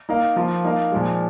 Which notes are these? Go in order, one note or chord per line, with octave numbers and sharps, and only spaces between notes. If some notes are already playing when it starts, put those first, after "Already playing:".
A#3 D#4 A#4 F5
F3 A#3 F4
A#3 D#4 A#4 F5
A#2 F3 G#3